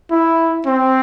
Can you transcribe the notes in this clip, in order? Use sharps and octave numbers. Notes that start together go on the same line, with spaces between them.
E4
C4